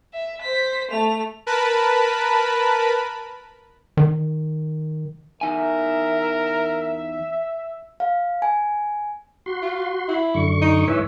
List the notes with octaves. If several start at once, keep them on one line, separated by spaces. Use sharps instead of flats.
E5
C5 B6
A3 F7
A#4 B4 A5 B5
D#3
E2 D#4 A#4 E5 G#5
F5
G#5
F#4 C6
F4
E4
F#2 D3 C#6
D#4
G#2 E3 C#5 E5